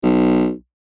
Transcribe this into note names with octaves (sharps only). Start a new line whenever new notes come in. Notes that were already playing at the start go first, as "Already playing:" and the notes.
B1